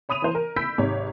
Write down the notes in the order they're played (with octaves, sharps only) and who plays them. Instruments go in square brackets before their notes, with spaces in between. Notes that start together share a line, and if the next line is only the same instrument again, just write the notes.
[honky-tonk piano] C#5 B5 D#6 D#7 F7
E3 C5
A#4
B5 E6 G6 B6 D7
G#1 C3 C#5